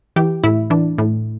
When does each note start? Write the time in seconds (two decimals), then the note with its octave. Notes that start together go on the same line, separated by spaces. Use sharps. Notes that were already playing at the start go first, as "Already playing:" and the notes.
0.16 E3 G4
0.43 A2 E4
0.70 E3 D4
0.98 A2